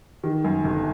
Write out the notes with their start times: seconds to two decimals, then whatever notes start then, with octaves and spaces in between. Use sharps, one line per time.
0.24 D#3
0.44 F#2
0.65 G1